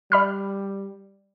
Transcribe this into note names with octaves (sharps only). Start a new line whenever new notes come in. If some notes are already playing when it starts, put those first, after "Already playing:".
G3 D5 B5 F6